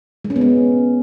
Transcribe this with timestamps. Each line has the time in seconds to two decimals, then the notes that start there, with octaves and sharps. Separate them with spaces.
0.25 G#3
0.30 C#4
0.36 B3
0.41 C#4